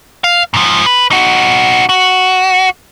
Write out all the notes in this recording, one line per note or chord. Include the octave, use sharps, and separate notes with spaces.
F5
G#2 F3
B4
D#4 F#4
F#4